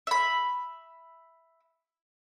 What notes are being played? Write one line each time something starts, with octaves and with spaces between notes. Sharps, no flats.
E5 B5